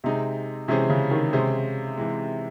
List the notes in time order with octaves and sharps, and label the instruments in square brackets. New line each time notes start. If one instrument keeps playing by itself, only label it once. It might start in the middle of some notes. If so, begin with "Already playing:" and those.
[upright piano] C3 [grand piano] G#3 C4 D#4 G#4
[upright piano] C3 [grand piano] E3 G#3 C#4 G#4 C5
[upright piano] C#3
D#3
[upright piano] C3 [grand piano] G#3 C#4 G#4 C5
[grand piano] C3 E3 G#3